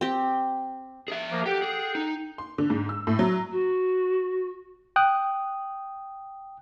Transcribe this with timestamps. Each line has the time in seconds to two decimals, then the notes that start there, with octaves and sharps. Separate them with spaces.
0.01 C4 G4
1.08 G#4 E5
1.31 F3 A#3
1.46 G4 A4 F#5 G5
1.62 G#4
1.95 D#4
2.38 C6
2.58 D3
2.70 G#2
2.89 E6
3.07 A2
3.19 F#3
3.52 F#4
4.96 G5 D#6 F#6